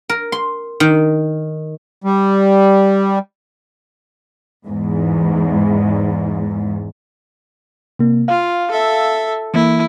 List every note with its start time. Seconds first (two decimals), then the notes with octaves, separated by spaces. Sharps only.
0.09 A#4
0.32 C6
0.80 D#3
2.04 G3
4.67 E2 G#2
7.99 C3 A#3
8.28 F4 F5
8.71 A4 E5
9.54 E3 A#3 E4